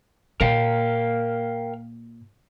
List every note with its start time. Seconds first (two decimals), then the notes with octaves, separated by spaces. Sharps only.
0.41 A#2 A#4 F5 G5